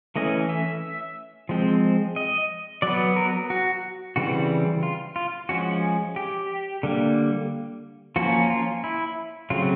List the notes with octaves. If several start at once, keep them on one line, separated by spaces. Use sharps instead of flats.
E3 A3 C#4 D#5
E5
F3 G#3 C4
D#5
F#3 B3 D5
A#4
F#4
C#3 E3 G3 C4 F#4
F4
F4
F3 G#3 C#4 F#4
G4
D3 G3 A#3
F3 A#3 C#4 F#4
F4
E4
C#3 F#3 A3 C4 F4